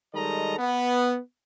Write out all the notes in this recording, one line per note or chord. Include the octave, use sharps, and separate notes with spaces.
D#3 G3 G#3 A4 D#5 A#5
B3